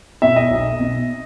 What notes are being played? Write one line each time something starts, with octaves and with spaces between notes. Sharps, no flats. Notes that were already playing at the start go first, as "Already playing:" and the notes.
B2 E5
D#5
B1
B2